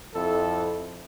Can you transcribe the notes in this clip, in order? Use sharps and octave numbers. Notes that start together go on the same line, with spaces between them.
F2 E4 A4